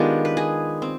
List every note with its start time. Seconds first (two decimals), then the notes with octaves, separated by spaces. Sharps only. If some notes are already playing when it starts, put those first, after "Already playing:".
Already playing: D#3 G#3 B3 D4 F4 G4
0.25 B4
0.37 G#4
0.82 C4